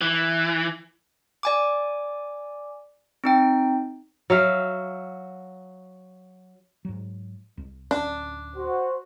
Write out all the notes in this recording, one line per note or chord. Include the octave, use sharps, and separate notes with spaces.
E3
D5 G#5 D6
C4 D#4 G5
F#3 E5 F5
G#2 F#3
C2
D1 C#4 D4
F#4 C5